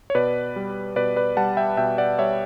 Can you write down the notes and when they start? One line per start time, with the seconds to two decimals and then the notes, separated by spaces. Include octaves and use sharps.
0.10 C#5
0.15 B2 B4 D5
0.56 G3
0.96 B2 B4 D5
1.16 B4 D5
1.37 G3 F#5 A5
1.57 E5 G5
1.77 B2 E5 G5
1.98 D5 F#5
2.18 G3 C#5 E5